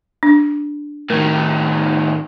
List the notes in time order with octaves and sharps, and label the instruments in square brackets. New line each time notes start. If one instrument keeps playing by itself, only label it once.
[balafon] D4
[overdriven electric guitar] A2 D#3 [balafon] A#4